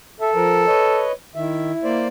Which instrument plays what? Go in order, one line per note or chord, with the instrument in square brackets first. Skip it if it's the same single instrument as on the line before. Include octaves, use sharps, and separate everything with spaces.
[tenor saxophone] A4 [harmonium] E5
[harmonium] F3 A#4
B4 C#5 D#5
[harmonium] D#3 E5 [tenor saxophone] E4
[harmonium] A#3 C5 D5